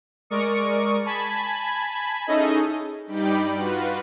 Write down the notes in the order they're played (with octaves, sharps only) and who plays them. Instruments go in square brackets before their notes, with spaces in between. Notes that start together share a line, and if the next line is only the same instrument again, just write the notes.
[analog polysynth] G#3 A#4 D5 C#6 D#6
G#5 A5 B5 G#6
C#4 D#4 E4 G#4 A4 D#5
[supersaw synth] G2 G3 D#4 G5 B5 D6
F4 F#4 B4